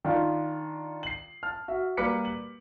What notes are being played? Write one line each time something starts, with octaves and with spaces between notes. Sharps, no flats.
D#3 D4 F4
C7 F#7
A5 F6
F#4 E5
G3 A#3 B4 D6 B6 C#7
F#7